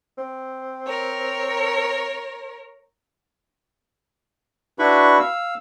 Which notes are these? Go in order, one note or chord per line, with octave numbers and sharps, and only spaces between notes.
C4
A#4 C#5
D4 E4 F#4 B4 B5 C#6
F5 E6